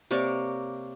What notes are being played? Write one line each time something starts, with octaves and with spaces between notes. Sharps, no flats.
C3 A#3 C#5 D5